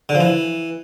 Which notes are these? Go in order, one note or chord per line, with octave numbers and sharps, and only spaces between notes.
D3
F3
E3